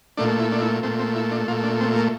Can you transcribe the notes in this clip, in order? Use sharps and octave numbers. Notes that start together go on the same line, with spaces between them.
A#2 A3 D4
E4
D4
E4
A#2 A3 C4
C4
E4
D4
A#2 A3 F4
D4
C4
A#3